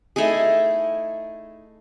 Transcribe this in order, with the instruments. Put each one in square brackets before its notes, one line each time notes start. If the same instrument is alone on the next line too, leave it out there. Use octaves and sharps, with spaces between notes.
[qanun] A3 D#4 E4 G#4